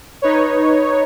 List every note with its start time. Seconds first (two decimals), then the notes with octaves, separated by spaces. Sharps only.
0.22 D#4 B4 C#5